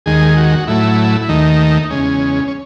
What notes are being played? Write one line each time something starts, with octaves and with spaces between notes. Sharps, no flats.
D#2 D#3 G#3 G#4
F#4
A2 F#3 A3 E4
E4
D#2 D#3 A3 D#4
E2 C#3 G#3 C#4
C#4